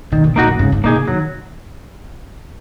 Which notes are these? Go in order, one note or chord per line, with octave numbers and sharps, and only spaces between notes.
A#2 D#3
A#2
A#2 A#3 D#4 F#4
F#2
G#2 C#3
G#2
A#2 A#3 D#4 G#4
C#3
D#3 F#3